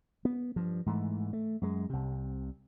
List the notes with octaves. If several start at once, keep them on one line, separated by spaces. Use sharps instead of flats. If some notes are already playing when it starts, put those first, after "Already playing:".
B3
G2 F3
G#2 E3 A3
A3
F#2 G#3
C2 C3